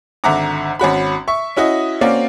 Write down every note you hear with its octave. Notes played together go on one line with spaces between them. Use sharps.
G#1 D3 E5 F#5 A#5 D6
G#1 C#4 F#4 B5
E5 C#6
C#4 E4 F#4 D#5
A#3 C4 C#4 F#4 D5 F5